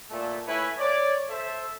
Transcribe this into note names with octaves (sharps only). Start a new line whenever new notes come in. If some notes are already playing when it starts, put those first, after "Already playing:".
A#2 A3
A3 E4 B4 C#5 G#5
C#5 D5
A4 C5 E5